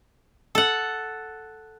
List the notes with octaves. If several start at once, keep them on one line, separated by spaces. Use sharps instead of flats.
A4 F#5